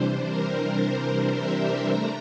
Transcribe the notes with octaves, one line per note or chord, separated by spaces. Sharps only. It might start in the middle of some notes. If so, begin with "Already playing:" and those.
Already playing: C3 E3 G3 D4 C5
A#4
C5
E5
A3 D4 A#5